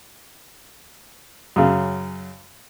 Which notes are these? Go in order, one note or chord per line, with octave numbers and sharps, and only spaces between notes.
F#2 C#3